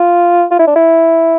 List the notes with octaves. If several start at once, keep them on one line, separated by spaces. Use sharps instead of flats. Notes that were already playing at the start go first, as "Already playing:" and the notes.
Already playing: F4
F4
E4
D4
E4